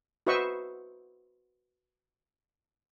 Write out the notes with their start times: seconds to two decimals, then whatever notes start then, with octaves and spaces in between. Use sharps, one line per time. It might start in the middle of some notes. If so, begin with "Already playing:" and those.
0.27 F#4 B4 C5 D#5 E5 C#6